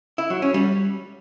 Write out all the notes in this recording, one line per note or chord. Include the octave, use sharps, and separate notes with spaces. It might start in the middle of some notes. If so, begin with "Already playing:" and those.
E4
F#3
C#4
G3